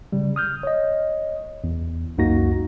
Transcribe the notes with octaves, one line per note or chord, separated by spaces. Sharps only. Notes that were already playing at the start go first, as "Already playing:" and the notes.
C#3 G3
D#6 F6 G6
C#5 D#5
E2
C#2 F#2 A#3 D#4 F#4 A#6